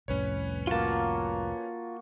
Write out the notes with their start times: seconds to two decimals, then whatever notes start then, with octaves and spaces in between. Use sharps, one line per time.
0.08 C2 F2 A2 C#4 B4 C#5
0.67 A#3 F4 F#4 A5